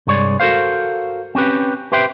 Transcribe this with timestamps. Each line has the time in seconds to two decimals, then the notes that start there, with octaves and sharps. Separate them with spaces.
0.07 C2 G2 G#3 C#5 D5
0.40 F#4 A4 A#4 C5 F5
1.35 C4 C#4 G4 B4
1.92 G4 B4 C5 E5 G5